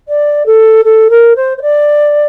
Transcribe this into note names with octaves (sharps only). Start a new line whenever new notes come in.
D5
A4
A4
A#4
C5
C5
D5